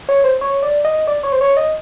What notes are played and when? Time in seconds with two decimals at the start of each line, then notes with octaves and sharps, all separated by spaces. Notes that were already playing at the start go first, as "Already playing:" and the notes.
0.09 C#5
0.24 C5
0.41 C#5
0.63 D5
0.85 D#5
1.07 D5
1.23 C#5
1.32 C5
1.41 C#5
1.57 D#5